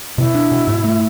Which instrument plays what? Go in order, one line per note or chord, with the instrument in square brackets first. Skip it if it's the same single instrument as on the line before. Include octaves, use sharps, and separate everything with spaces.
[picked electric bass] B2 [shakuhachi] E4
[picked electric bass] D4
B2
G#2
A3